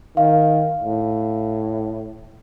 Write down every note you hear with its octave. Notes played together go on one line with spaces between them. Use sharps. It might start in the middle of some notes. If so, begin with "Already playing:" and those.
D#3 F5
A2